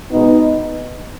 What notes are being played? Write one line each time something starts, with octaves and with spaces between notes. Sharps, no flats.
B2 G#3 B3 D#4